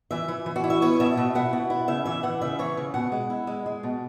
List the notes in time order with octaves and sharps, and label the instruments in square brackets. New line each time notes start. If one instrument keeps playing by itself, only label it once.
[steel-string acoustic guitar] E3 E5
E3
E3
F#4
E4
E5
B3 C#5
B2 E5
B2
E4 F#5
B2
E4
C#3 E5
E3 E5
E3 F#5
C#3 E5
E3 C#5
C#3
B2 F#5
G#3
E4
G#3
G#3
B2